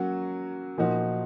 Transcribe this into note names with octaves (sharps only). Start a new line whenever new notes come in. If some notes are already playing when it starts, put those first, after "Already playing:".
Already playing: F#3 A#3 C#4 F#4
A#2 F3 A#3 D#4 F#4